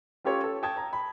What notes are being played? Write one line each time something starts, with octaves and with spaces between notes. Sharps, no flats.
C#4 F4 G4 A4 C#5
A4
G5 A5 D#6 G#6
A#5
B5